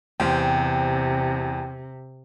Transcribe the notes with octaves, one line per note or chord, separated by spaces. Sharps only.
E2 C3 G4 C5 F5 G5